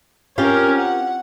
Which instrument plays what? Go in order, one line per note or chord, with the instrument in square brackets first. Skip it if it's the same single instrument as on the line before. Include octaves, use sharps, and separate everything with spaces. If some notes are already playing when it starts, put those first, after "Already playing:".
[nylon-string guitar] C4 F4 G4 [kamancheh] C#4 A#4
[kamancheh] F#5